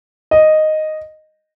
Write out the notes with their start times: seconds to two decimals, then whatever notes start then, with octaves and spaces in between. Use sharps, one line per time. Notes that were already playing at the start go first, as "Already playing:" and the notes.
0.31 D#5